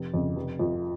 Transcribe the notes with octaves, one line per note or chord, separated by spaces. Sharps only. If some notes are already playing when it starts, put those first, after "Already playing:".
Already playing: F1
F2 C#3
F1
F2 F3